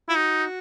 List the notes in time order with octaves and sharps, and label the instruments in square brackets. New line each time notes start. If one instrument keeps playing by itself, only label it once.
[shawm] E4 [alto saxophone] F4
[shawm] D#4 [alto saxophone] F#4